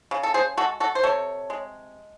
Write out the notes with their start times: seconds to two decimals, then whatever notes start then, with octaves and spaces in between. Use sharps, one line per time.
0.11 C#3
0.23 A4
0.34 G#4 C5
0.57 G#3 F#4 A4
0.80 F#4 A4
0.95 C5
1.03 C3 A4 C#5
1.50 G#3